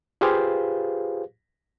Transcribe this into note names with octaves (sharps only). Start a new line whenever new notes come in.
F4 G4 G#4 B4 C5 F5